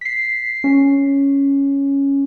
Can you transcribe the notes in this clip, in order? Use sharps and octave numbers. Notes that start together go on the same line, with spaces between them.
B6 C7
C#4